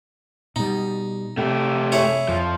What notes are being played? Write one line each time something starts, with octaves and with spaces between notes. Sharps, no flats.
B2 G3 D#4
C3 A3 G4
E4 G#4 C#5
F2 F3